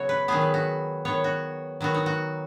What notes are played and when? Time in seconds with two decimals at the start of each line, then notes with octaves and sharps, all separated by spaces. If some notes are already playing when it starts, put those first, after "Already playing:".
Already playing: C#3 F#3 B3 F#4 C#5
0.09 B4
0.28 D#3 F#3 B3 G#4
0.41 B4
0.54 F#4
1.05 D#3 B3 C#5
1.24 F#4
1.81 D#3 F#3 B3 F#4
1.94 D#4
2.06 F#4